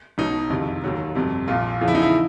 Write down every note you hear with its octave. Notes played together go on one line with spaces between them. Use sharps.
B1 B2 F#3 D#4
F#1 F2 C3 D#3
D#2 D#3 F#3
G1 F2 C3
A#1 A#2 F3 F4
E2 C#3 F3 F4
E4
D#4
E4